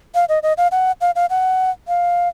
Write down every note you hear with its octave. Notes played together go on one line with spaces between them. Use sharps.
F5
D#5
D#5
F5
F#5
F5
F5
F#5
F5